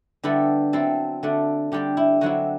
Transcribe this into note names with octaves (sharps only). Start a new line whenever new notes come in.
D3 G3 B3 E4 A4
F#3 C4 E4 A4
D3 A3 D4
D3 G3 D4 G4
E4
D3 F#3 C4 E4 F#4